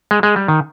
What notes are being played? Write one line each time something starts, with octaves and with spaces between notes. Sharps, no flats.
G#3
G#3
G3
D#3